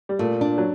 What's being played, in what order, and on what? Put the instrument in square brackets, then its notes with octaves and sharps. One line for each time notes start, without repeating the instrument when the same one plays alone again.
[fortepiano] G3
[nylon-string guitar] A#2 [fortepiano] A3
[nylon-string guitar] D4
[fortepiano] F#3